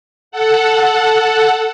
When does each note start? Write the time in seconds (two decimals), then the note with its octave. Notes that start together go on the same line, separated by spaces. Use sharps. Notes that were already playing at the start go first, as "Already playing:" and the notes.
0.31 A4 F#5